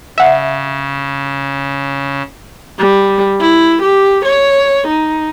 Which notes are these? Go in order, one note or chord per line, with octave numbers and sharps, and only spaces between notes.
C#3 E5 F#5
G3
E4
G4
C#5
D#4